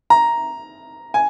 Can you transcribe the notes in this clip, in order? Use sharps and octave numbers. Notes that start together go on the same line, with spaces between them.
A#5
G#5